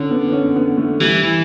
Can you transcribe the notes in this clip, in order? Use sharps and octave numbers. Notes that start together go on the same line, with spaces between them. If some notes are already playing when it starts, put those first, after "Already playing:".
Already playing: D3 C#4
B3
B3
C#4
B3
A3
E3 G3
E3